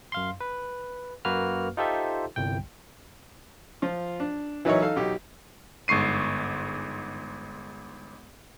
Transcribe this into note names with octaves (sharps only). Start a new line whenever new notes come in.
F#2 F5 C6
B4
F#2 A#3 F#4 B4 F6
D#4 F4 G4 A4 C5 E5
G1 C2 G5
F3 F4
D4
E3 F#3 D#4 E4 A#4 C#5
D#4 A4 F5
B1 D#4 G4
G1 G#2 C#6 C7 D#7